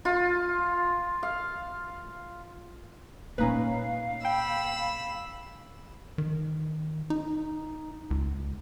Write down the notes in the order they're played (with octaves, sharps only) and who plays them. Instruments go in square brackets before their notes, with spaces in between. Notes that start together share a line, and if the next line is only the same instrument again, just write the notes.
[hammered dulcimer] F4
F5
[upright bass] A#2 A#3 [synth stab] C#4 D#4 B4 [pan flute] F5
[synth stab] G5 [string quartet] B5 E6
[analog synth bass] D#3
D#4
C#2